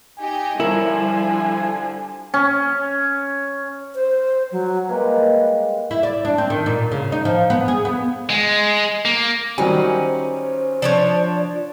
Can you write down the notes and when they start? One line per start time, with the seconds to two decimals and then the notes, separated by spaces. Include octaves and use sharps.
0.19 D#4 G4 D#5 G#5
0.60 D3 F3 G3 E4 A#4 C#5
2.34 C#4
3.95 C5
4.52 F#3
4.89 G3 G#3 A#3 B4
5.91 E4
6.03 D5
6.25 D4
6.38 C4
6.50 D#3
6.66 A#2
6.92 C#3
7.12 D#4
7.25 F3
7.50 B3
7.68 G#4
7.85 B3
8.30 G#3
9.05 A#3
9.58 D#3 F#3 G3 C#4 C5 G#5
10.82 F3 D4 C#5 D5